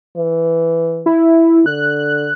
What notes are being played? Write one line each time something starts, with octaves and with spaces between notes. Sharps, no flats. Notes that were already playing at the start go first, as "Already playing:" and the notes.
E3
E4
D3 F#6